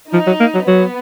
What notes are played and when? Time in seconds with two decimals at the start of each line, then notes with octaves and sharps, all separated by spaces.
0.13 F3 D#4
0.27 F#3
0.40 A#3
0.54 F#3
0.67 F#3 B3